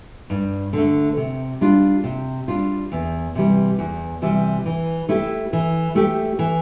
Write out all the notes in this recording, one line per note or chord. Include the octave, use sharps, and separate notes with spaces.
G2
D3 A3
C3
G3 D4 F4
C3
G3 D4 F4
E2
C3 E3 G3
E2
C3 E3 G3
E3
A3 E4 G4
E3
A3 E4 G4
E3